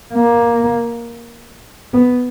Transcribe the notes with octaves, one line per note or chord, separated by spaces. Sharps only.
A#3
B3